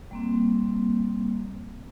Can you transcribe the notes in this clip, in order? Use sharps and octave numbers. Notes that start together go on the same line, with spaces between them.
G3 A#3 C4